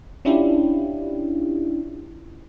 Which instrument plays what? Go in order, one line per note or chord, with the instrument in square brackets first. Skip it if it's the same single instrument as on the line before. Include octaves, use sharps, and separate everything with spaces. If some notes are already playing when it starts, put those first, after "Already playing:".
[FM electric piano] C#4 D4 E4 F4 G4